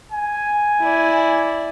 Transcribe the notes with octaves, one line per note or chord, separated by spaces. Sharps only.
G#5
E4 D5